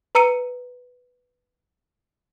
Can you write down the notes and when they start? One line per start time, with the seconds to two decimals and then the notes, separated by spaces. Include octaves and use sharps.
0.15 B4 A#5 E6 C#7 D#7